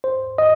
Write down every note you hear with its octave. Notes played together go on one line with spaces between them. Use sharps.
C5
D#5